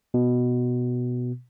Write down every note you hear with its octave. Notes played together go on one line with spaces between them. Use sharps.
B2